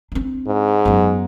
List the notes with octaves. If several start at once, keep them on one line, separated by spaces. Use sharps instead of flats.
C4 D4
G#2
F#2 B3